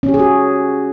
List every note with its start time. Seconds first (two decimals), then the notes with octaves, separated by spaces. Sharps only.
0.03 C#4
0.09 G4
0.14 G#4
0.19 F#4